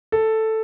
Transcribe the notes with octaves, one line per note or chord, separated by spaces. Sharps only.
A4